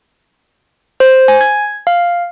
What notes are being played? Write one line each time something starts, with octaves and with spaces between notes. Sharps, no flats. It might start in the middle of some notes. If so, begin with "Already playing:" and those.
C5
G#5
G#6
F5